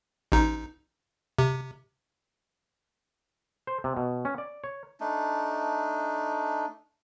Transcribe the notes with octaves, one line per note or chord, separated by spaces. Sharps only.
A1 D#4
C3
C5
C3
B2
C#4
D5
C#5
A3 D4 D#4